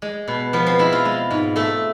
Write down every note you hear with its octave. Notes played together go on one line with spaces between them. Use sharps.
G#3
B2
F3 B3
C4
G#3 E4
F4
G#3
G#2
A3 A4